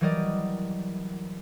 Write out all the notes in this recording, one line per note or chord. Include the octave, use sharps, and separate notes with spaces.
E3 F#3 G3 A#4 D5 D#5